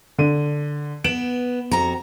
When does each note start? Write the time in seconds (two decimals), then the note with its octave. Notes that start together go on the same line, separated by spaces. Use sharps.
0.18 D3 D#7
1.04 B3 D7 E7 F#7
1.71 F2 F#4 A#5